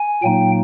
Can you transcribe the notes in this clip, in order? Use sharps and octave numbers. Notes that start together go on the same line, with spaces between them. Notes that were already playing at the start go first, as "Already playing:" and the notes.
Already playing: G#5
A#2 F#3 A#3 D#4 G5